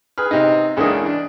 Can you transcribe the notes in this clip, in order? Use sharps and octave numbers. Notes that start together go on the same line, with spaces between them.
G#4 B4 F6
C3 D#4
C#2 C#3 E3 A#3 D4 D#5
D4